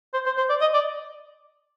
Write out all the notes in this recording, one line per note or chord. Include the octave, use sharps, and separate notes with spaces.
C5
C5
C5
D5
D#5
D5